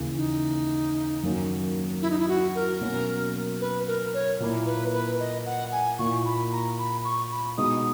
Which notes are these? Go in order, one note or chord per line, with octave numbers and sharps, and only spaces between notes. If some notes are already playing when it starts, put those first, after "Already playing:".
Already playing: D#2 C#3 E3
D#4
F#2 D#3 A#3 C#4 F#4
E4
D#4
E4
F#4
A#4
B2 F#3 A#3 C#4 F#4
B4
A#4
C#5
A#2 A#3 E4
B4
B4
D#5
F#5
G#5
A#2 A#3 E4 C#6
B5
A#5
B5
C#6
B5
B2 G#3 B3 D#4 F#4 D#6